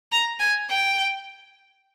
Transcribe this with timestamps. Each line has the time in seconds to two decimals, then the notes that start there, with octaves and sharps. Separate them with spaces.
0.12 A#5
0.40 G#5
0.69 G5